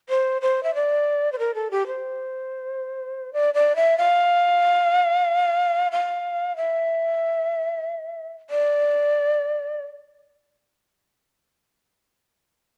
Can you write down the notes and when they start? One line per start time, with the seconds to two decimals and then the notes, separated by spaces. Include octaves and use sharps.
0.09 C5
0.42 C5
0.63 E5
0.75 D5
1.32 C5
1.39 A#4
1.55 A4
1.71 G4
1.87 C5
3.33 D5
3.54 D5
3.76 E5
3.98 F5
5.92 F5
6.57 E5
8.50 D5